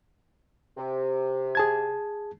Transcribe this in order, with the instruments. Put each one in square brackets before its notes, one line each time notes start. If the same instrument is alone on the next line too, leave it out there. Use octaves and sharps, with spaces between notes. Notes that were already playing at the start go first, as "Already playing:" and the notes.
[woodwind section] C3
[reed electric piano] G#4 A5 G#6